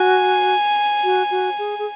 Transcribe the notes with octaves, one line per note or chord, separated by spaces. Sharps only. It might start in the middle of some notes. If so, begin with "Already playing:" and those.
Already playing: F#4 G#5
F#4
F#4
G#4
G#4